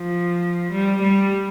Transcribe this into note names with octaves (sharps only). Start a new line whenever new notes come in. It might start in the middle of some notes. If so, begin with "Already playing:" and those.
Already playing: F3
G3
G3